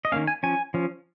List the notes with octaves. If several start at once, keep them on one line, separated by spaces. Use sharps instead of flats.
D#5
D#3 A#3 C#4 F5
G#5
F3 C#4 G#5
F3 C#4